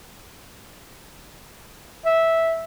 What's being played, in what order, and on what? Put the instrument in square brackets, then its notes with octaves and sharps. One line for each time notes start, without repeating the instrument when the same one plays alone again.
[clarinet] E5